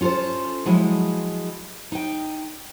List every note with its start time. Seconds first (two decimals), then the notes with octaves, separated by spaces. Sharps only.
0.01 C#4 F4 F#4 A4 C5
0.66 F3 F#3 G#3 E4
1.92 D#4 G5